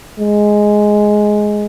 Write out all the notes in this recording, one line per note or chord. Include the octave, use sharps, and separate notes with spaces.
G#3